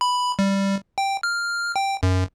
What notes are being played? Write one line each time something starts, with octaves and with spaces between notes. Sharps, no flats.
B5
G3
G5
F6
G5
F#2